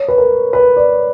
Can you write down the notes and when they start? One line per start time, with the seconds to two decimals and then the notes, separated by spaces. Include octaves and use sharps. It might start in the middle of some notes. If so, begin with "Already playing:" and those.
Already playing: C#5
0.08 B4
0.18 A#4
0.53 B4
0.77 D5